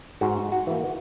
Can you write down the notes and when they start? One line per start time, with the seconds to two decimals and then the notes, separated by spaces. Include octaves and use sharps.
0.21 G#2 F#4
0.52 F#4
0.67 E3 A#3
0.83 F#4